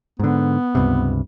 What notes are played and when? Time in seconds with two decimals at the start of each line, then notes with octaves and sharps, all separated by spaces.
0.20 G#2 D3 B3
0.75 C#2 G2 C3